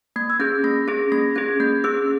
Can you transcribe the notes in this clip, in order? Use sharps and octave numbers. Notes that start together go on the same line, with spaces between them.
A#3 G#6
E6
C#4 G#4 G6
A#3 A#6
C#4 G#4 A#6
A#3 A#6
C#4 G#4 G#6
A#3 G6
C#4 G#4 E6